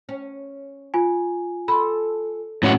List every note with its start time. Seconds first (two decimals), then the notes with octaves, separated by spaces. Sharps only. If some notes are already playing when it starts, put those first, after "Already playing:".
0.09 C#4
0.94 F4 G#5
1.68 A4 B5 C6
2.63 A2 G3 G#3 C#4 F#4